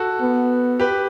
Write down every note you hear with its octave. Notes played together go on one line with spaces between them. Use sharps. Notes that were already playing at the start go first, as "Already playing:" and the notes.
Already playing: F#4 A4
B3
G4 B4